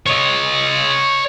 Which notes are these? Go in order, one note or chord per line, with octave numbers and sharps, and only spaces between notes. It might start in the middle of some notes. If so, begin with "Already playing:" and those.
C#5 D#5